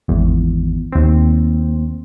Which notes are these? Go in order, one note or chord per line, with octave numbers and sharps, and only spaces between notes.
G#1 E2
D#2 C4